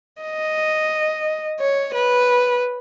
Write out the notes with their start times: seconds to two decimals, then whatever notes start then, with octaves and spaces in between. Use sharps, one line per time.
0.22 D#5
1.60 C#5
1.94 B4